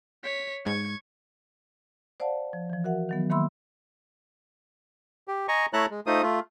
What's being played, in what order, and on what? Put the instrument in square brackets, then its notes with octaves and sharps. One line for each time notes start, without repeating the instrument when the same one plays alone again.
[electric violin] C#5 B6
[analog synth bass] G#2 [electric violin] C#6 G#6
[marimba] C5 D5 F5 F#5 A5
F3
E3 F3
F#4 A#4 E5 F#5
D#3 F#3 B3
D#3 A#3 E5 B5 C6 E6
[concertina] G4
D#5 G#5 A#5 C#6
A3 E4 C#5 A5 A#5 F#6
G#3
A3 D#4 F4 C5 D#6
A3 F4